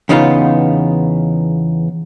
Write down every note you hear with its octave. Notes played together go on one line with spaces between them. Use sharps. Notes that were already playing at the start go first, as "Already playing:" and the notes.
E2 C#3 B3 D#4 F4